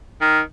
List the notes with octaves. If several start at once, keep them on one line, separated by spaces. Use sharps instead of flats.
D#3